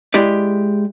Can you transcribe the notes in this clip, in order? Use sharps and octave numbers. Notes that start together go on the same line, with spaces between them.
G#3 E4 G4 D5